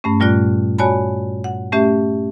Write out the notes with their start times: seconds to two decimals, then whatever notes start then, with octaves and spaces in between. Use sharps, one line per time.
0.04 G2 A3 C#4
0.20 A#2 G3 F4 D5 F#6
0.78 F#4 C#5 D5 G#5 A5 B5
1.44 F#5
1.72 A3 C#4 G4 E5